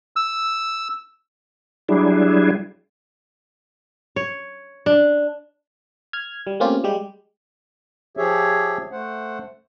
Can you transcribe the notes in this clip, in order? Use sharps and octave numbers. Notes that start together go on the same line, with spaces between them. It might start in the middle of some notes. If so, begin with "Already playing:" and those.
E6
F#3 G3 D4 E4 G#4
C#5
D4
F6 G#6
G3
A3 A#3 C4 C#4 F4 G4
G3 G#3 G4
F3 G4 G#4 C#5 E5
A3 C5 F#5